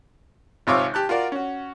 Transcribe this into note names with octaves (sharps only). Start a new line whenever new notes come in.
G#1 C3 F4 C#5 D6 E6
G4 A5 F#6
F4 F#4 A#4 D5
C#4 F#4